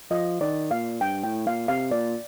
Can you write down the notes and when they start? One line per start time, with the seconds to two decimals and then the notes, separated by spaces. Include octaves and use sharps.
0.10 F3 D#5
0.41 D#3 D5
0.71 A#2 F5
1.01 G2 G5
1.24 A2 G5
1.47 A#2 F5
1.68 C3 F5
1.91 A#2 D5